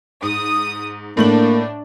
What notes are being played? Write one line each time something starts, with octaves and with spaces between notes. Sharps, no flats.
G#2 D#6
A2 A3 A#3 D4 F#7